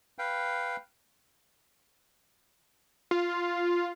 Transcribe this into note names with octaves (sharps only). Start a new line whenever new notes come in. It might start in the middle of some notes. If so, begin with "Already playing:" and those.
B4 F5 G5
F4